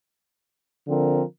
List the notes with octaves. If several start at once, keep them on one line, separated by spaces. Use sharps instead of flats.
D3 F3 C4 A#4